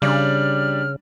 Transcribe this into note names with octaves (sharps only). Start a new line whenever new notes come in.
C#3 G3 D4 F6